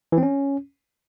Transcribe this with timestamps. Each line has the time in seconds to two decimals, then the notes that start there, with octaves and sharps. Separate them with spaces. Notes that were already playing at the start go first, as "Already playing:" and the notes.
0.12 E3
0.18 C4
0.23 C#4